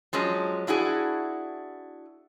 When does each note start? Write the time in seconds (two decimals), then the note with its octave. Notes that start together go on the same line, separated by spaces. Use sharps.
0.13 F3 F#3 G#3 C#4
0.67 D4 E4 F#4 G#4